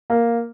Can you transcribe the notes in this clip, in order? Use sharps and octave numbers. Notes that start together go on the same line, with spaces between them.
A#3